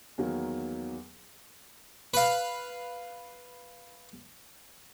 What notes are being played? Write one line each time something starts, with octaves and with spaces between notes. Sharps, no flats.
E2 D#3 F#3 A#3
B4 F5